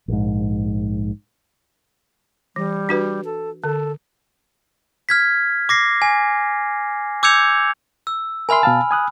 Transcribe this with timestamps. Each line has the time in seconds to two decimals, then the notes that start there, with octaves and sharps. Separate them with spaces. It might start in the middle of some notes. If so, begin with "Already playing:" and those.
0.08 A#1 G#2
2.56 E3 G3
2.89 D4 F#4 B4
3.25 A4
3.64 D3 A4
5.09 F6 G#6 B6
5.69 D6 A#6 C7
6.02 G#5
7.23 D6 E6 G6 G#6 C#7 F7
8.07 E6
8.49 A#4 E5 G#5 B5 C6 F6
8.63 B2 F5 A5
8.91 G#5 D#6 F#6